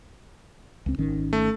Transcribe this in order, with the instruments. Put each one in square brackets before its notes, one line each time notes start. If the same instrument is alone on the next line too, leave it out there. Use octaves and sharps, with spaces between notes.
[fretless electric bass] C#2 C4
G#1 D#3 C#4
[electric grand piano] A3